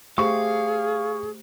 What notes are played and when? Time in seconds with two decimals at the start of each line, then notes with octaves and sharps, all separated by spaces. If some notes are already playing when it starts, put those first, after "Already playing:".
0.18 A3 G4 G#4 C5 F5 C#6